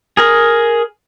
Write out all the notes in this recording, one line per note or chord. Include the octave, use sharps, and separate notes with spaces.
G#4 A#4